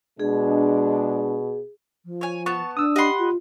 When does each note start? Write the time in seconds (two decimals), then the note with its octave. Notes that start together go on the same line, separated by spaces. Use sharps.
0.20 B2 G#3 D4 G#4
2.05 F3
2.21 C#5 G#5
2.46 B3 A5 C#6
2.77 D4 D#6 E6
2.96 G4 D#5 F#5 B5 C6
3.18 F4